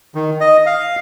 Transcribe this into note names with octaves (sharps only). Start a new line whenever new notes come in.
D#3
D#5
F5